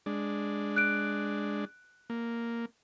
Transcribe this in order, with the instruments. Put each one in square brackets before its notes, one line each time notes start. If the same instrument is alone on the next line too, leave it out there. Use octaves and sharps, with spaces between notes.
[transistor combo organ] G#3 D4
[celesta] F#6 D7
[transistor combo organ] A#3